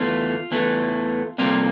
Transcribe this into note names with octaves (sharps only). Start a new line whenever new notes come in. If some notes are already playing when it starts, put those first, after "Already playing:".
Already playing: E2 E3 A3 F4
E2 E3 A3
F2 C3 G3 A#3 F4